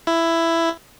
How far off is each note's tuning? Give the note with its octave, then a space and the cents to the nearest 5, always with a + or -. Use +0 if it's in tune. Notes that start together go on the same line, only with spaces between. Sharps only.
E4 +10